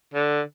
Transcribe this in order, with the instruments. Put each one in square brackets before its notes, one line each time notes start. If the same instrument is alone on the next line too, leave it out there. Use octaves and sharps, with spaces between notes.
[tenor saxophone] D3